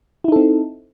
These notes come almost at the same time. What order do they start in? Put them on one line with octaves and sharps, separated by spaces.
E4 D#4 A4 C4